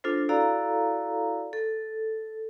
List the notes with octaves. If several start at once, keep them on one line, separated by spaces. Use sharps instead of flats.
D4 F4 A4 C5
E4 F#4 A4 D5 F5 A#5
A4